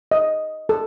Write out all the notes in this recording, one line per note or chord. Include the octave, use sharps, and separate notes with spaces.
D#5
A4